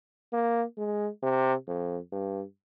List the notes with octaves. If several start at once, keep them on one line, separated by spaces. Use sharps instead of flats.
A#3
G#3
C3
F2
G2